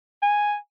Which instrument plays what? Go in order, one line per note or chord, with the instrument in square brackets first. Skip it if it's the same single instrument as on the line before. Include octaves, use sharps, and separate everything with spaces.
[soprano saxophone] G#5